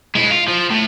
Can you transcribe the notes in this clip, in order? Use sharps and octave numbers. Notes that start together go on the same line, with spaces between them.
G#3 E4
F4
F3
A2